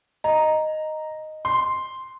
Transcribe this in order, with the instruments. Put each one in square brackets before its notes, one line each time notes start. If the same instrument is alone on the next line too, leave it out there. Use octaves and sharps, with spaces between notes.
[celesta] D#5 [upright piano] A#5
[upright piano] C6